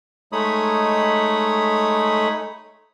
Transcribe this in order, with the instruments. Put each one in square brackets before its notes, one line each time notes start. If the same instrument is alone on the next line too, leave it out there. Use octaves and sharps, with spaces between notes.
[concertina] G#3 A3 D#4 C#5 B5 D#6